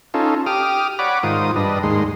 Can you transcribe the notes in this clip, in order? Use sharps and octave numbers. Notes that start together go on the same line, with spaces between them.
C#4 D#4 F4 A4
G4 D6 D#6 F6
C#5 D5 F#5 B5 D6
G#2 D#3 F4 C5 D#6
G2 D4 B4 D#5
D#2 G#2 G#3 C6